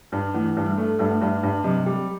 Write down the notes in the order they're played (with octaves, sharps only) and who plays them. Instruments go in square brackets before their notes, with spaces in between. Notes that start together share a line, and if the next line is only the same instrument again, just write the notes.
[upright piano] G2
[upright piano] E3 [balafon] A3
[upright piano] G2
[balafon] G3
[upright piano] A3
[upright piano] G2 [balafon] G3
[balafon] A3
[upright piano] G2 [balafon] G3
[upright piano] G2
[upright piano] C3 [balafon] F#3
[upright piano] G3